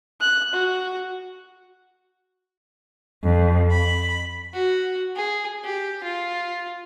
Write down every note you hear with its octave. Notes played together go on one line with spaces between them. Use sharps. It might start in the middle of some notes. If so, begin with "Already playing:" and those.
F#6
F#4
F2
B5
F#4
G#4
G4
F4